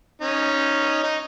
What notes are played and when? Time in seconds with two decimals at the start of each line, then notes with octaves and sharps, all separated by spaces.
0.21 C#4 D#4
1.04 D#4